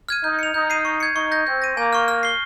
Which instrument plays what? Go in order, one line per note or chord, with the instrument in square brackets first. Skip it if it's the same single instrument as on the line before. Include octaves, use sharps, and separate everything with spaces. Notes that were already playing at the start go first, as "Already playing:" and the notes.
[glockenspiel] F6 G#6 D#7
[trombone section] D#4 [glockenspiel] G6
[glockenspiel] C#7 F7
[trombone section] D#4 [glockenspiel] G6
[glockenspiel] C7 D#7
C#6
G#6 C#7
[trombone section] D#4 [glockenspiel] C#6
[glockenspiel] G6 A#6
[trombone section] C4 [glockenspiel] G6
[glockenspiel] A#6 D#7
[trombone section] A#3 [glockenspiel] G#5
[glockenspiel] C#6 F6
F6
C7 G7